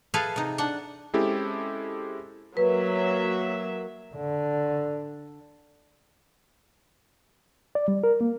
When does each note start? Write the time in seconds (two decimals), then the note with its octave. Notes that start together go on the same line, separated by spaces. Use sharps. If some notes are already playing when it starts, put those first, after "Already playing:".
0.14 G#4 A4 B4 E5 F5
0.36 C3 D#4
0.58 D4 F#5
1.14 G#3 C4 C#4 E4 G4 A4
2.57 F#3 A#3 B4 E5
4.16 D3
7.75 D5
7.88 G3
8.04 A#4
8.21 A#3